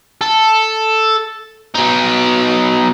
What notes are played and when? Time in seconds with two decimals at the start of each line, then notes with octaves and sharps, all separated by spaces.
0.21 A4
1.75 B2 D#4